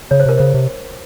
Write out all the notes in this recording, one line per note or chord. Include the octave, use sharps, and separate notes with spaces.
C#3 C#5
C5
C3 A#4
C#3 C5
C3